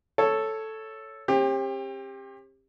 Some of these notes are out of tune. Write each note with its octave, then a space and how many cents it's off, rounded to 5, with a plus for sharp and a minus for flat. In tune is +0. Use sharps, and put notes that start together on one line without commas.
A4 +0 C#5 +0
C4 +45 G4 +25